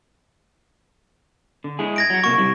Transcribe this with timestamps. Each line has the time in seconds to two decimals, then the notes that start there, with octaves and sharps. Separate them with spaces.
1.64 D3
1.79 G#3 E4 G#4
1.96 G#6 A#6 D7
2.10 F#3 F#4
2.24 C3 A#3 F#4 C#6
2.38 C3 G3 E4